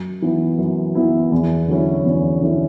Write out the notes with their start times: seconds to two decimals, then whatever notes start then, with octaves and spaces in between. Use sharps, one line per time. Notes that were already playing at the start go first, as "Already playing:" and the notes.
Already playing: F#2
0.22 E3 B3 E4
0.58 F#2
0.95 E3 B3 E4
1.32 E2
1.68 D3 F#3 C#4 E4
2.05 E2
2.41 D3 F#3 C#4 E4